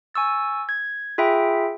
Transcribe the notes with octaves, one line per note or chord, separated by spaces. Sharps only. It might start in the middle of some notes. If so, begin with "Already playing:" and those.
G#5 C#6 E6 A6
G#6
F4 G#4 E5 G5 B5